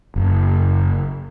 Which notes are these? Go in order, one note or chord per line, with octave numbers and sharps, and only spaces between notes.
F#1